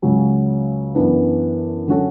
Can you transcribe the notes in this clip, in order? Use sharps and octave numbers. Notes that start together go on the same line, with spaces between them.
C#2 C#3 F#3 C#4
F#2 E3 B3 D4
D3 F#3 C#4 F#4 A4